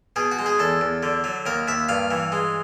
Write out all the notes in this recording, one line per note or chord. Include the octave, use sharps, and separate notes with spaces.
B2 G#4
F#4
G#3
G#4
E2 A4
E2
D3
F#3
D#2 A#4
D#2 E5
G2 F5
E3
G#3